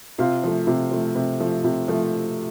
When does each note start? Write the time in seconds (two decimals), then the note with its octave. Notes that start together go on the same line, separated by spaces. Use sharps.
0.18 C3 F4 F5
0.43 F3 A3
0.67 C3
0.91 F3 A3
1.15 C3
1.40 F3 A3
1.64 C3
1.88 F3 A3